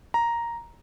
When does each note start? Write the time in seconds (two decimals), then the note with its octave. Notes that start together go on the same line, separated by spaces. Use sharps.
0.14 A#5